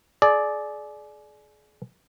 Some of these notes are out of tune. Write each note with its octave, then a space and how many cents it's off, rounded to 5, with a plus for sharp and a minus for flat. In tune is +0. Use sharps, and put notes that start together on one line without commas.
G#4 +35 D5 +5